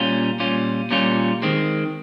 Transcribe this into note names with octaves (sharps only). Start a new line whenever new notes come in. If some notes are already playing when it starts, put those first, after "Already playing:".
Already playing: A#2 G3 C#4 F4
A#2 G3 C#4 F4
A#2 G3 C#4 F4
D#3 G#3 C4